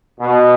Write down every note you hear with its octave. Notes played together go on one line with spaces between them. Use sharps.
B2